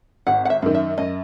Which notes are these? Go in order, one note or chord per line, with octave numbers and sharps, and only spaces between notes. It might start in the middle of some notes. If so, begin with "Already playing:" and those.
G#1 F#5
F#5
E5
F#2 D#3
E5
F#2 D#5